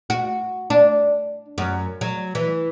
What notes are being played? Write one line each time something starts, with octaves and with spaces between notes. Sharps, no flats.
F#4
D4
F#2
F#3
E3